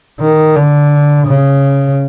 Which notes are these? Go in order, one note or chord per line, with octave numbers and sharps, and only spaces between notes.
D#3
D3
C#3